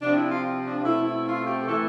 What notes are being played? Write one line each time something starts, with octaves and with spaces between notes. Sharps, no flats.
C3 F3 C4 D4
E4
F4
D4
B2 A3 C4 E4
E4
F4
G4
A2 E3 A3 A4